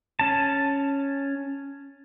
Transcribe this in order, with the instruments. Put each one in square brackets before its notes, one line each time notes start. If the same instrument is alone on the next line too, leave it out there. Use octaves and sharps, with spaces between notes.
[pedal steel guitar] C#4 A5